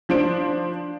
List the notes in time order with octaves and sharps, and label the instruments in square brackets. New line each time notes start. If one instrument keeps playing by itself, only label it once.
[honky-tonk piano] F3 D4 C5 D7